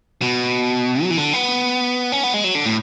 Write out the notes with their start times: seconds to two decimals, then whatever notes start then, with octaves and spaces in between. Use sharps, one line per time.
0.22 B2
1.03 F#3
1.11 E3
1.18 D3
1.33 B3
2.12 C#4
2.23 B3
2.34 G#3
2.44 F#3
2.55 D3
2.66 A2